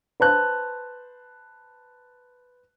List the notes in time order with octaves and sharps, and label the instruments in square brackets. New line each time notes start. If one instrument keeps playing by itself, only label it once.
[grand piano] B4 C5 A5 F#6